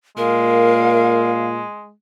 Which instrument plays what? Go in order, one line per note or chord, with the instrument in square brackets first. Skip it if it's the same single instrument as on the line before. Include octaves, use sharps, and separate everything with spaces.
[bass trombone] A#2 [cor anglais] G#3 [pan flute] A#4 [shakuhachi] F5